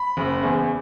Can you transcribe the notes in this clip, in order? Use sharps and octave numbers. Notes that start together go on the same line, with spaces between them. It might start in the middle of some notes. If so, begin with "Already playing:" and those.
Already playing: B5
F#1
E2